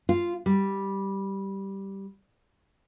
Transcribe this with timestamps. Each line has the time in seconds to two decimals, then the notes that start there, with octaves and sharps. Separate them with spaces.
0.09 F4
0.46 G3